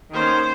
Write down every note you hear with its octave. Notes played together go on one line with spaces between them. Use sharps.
D#3 A#3 C#4 C5